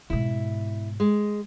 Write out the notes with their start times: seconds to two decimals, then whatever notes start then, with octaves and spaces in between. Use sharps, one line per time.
0.10 G#2 B2 E4
1.00 G#3